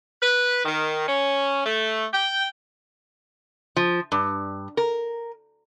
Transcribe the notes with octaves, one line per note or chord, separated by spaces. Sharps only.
B4
D#3
C#4
A3
G5
F3
G2
A#4